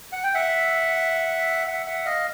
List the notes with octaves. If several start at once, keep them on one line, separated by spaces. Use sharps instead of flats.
F#5
G5
E5 F#5
E5 F#5
E5 F#5
D#5 F5